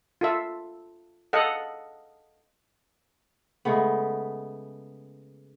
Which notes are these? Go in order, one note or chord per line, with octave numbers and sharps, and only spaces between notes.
F4 A4 E5
A4 D#5 F5 F#5
C#3 G#3 A3 B3